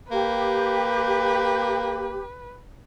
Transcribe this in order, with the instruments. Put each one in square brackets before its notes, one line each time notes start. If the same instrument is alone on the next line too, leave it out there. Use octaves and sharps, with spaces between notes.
[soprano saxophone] A#3 [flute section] G4 [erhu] B4